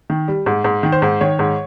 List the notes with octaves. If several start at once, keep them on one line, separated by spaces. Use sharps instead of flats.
D#3
G3
G#2
G#2
D#3
C5
G#2
D#3 C#5
G#2